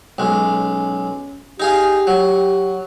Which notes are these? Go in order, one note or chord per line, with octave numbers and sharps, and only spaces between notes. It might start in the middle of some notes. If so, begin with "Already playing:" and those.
B1 G#3 C#4
D#4 G4 G#4 F5
F#3